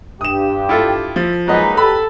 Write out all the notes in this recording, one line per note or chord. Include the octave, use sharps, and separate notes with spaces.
G2 G4 D#6 E7
E4 F4 A4
F3
F#3 G#3 A#3 D#4 B4 D#5
G4 A4 B4 B5